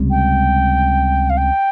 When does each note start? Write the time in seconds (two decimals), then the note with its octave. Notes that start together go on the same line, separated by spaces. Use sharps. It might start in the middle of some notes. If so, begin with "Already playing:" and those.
Already playing: C#2 C3 G3
0.10 G5
1.29 F5
1.37 G5